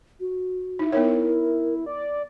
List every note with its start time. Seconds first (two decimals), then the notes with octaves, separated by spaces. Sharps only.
0.20 F#4
0.79 D#4 E4
0.92 B3 D#4 A#4 C#5
1.86 D5